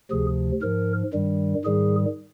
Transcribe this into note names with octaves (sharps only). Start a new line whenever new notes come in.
D2 C3 F3 G#4
G#2 F3 A#4
G2 D#3 G3
G#2 D#3 G3 G#4